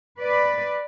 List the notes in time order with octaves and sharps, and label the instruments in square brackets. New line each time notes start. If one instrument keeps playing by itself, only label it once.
[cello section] B4 D5